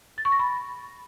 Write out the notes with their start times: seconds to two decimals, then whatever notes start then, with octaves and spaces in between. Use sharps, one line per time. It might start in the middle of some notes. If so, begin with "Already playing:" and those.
0.18 A6
0.25 C#6
0.32 A#6
0.39 B5